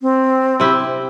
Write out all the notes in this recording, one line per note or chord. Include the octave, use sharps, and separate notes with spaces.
C4
C3 E4 G4